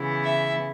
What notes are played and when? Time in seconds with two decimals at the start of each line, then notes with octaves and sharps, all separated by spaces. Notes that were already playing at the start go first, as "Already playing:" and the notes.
Already playing: C#3 E3 B3 E4
0.24 E5